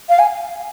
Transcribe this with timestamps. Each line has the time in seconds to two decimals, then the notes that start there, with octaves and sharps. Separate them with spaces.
0.09 F5
0.19 G#5